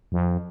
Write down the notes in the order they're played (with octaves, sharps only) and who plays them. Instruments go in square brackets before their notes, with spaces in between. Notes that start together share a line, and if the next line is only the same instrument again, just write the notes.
[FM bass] F2